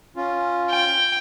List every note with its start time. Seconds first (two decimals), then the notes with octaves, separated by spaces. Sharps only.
0.16 C#4 F4
0.71 G5